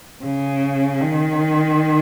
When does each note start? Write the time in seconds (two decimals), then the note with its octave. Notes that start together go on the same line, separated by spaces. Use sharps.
0.24 C#3
1.00 D#3